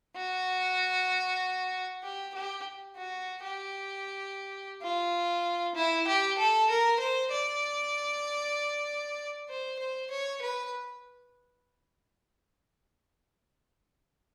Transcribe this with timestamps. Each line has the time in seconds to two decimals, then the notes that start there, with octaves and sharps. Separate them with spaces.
0.16 F#4
2.04 G4
2.35 G4
2.96 F#4
3.43 G4
4.82 F4
5.75 E4
6.07 G4
6.38 A4
6.70 A#4
7.00 C5
7.32 D5
9.49 C5
9.79 C5
10.11 C#5
10.42 B4